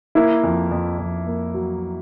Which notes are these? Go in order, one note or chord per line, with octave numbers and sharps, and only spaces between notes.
A#3 E4
F2
F2
F2
A#3
F#3